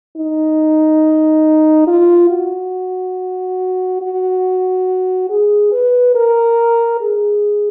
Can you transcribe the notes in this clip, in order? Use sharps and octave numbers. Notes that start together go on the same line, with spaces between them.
D#4
F4
F#4
F#4
G#4
B4
A#4
G#4